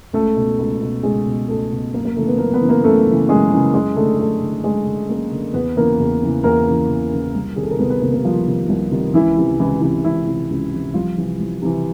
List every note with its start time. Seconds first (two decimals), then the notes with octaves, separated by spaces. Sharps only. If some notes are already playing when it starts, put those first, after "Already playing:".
0.13 C#2 A3 A4
0.36 B2
0.59 C#2
0.82 B2
1.03 C#2 G#3 G#4
1.26 B2
1.48 C#2 A3 A4
1.72 B2
1.93 F#2 A#3 A#4
2.05 A#3 A#4
2.16 C#3 E3 A3 A4
2.27 B3 B4
2.38 F#2 A#3 A#4
2.54 B3 B4
2.62 C#3 E3
2.69 A#3 A#4
2.83 F#2 A3 A4
3.06 C#3
3.12 E3
3.29 F#2 G#3 G#4
3.52 C#3 E3
3.74 F#2 G#3 G#4
3.96 D3 A3 A4
4.18 F#2 A3 A4
4.42 D3
4.64 F#2 G#3 G#4
4.86 D3
5.09 F#2 A#3 A#4
5.32 D3
5.54 E2 B3 B4
5.76 C#3 E3 A#3 A#4
5.99 E2
6.22 C#3 E3
6.44 E2 A#3 A#4
6.67 C#3 E3
6.89 E2
7.12 C#3 E3
7.35 C2
7.56 C3 D#3 G#4
7.63 A4
7.71 A#4
7.79 C2 B3 B4
7.90 B3 B4
8.02 C3 D#3 A#3 A#4
8.14 A#3 A#4
8.24 C2 F3 F4
8.47 C3 D#3
8.69 C2
8.92 C3 D#3
9.14 C#2 E3 E4
9.37 C3 E3
9.59 C#2 E3 E4
9.81 C3 E3
10.04 C#2 E3 E4
10.26 C3 E3
10.50 C#2
10.71 C3 E3
10.94 C2 F3 F4
11.18 C3 E3
11.40 C2
11.62 C3 E3